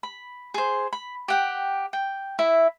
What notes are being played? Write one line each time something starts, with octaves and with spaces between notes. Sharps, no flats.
B5
G#4 C5
B5
G4 F#5 G5
G5
E4 E5